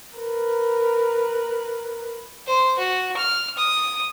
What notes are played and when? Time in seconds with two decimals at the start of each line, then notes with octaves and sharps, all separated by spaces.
0.16 A#4 B4
2.46 C5
2.78 F#4
3.17 F6
3.57 D#6